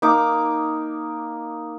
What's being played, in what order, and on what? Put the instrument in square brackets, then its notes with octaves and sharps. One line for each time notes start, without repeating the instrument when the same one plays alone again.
[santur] A#3 D#4 D6